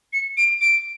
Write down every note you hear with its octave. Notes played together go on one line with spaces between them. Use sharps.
C#7
D7
D7